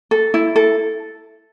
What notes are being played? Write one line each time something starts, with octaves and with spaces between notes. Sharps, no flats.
A4
E4
A4